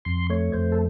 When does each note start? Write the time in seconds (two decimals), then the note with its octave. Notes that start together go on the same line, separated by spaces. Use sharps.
0.05 F2 C6
0.30 A3 C#5
0.53 F2 C5
0.72 A4